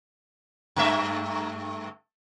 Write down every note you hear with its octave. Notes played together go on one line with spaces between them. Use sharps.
G2 A3 E5